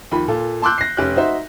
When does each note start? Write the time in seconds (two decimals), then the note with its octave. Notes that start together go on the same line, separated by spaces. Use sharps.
0.11 D#2 F3 B5
0.28 A#2 F4 A4
0.62 A5 C6 D6 E6 F#6 G6
0.78 A#6 C7
0.97 F1 C#4 G4 F#6
1.16 D#4 F#4 C5 E5